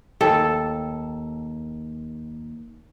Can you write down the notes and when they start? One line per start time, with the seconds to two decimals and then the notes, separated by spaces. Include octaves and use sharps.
0.21 D#2 A4 G5 A5